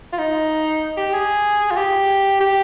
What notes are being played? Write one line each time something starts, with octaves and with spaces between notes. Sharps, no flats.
F4
D#4
G4
G#4
F4
G4
G4